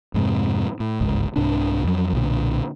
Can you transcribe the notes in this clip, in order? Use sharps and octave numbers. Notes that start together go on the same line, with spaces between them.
F2 G#2 C3
A2
G1 C#2 G#2
C2 G#2 C3 D4
F2 F#3
B1 A#2 D3